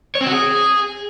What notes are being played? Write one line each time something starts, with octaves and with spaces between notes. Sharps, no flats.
C#5
C4
F#4
G#4